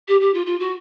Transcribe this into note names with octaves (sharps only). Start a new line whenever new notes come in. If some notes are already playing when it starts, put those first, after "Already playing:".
G4
G4
F4
F4
F#4